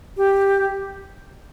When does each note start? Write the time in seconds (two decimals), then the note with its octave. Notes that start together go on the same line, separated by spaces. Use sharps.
0.17 G4